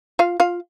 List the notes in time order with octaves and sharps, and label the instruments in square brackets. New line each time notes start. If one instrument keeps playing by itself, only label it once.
[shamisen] F4 F5
F4 F5